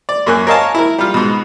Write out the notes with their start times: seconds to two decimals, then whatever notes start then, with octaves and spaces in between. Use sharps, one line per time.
0.09 D5
0.26 F#2 A#3 G#5 F#6
0.47 A#4 C#5 D#5 F5 G#5 A5
0.75 E4 A#4
0.98 G3 F4
1.14 G#2 B2